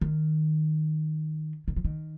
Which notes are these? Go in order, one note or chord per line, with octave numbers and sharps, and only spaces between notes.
D#3
D#3
F3
D#3